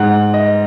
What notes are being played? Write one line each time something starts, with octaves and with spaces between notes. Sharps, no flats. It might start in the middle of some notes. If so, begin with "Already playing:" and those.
Already playing: G#2 G#3 F#5
D#5